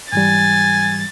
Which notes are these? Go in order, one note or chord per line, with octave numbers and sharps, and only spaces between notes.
G#2 E3 G3 G#5 A6